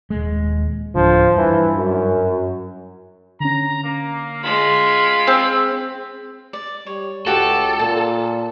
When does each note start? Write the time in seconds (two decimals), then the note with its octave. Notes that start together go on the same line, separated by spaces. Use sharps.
0.10 D#1 G#3
0.95 D1 D3 F3
1.36 G2 E3
1.77 F#2
3.40 D3 C#4 A#5
3.84 A#3
4.44 G#3 F4 B5
5.27 C4 G#4
6.53 D5
6.86 G3 C#5
7.27 C#2 F#4 G4 A4
7.79 A#2 A5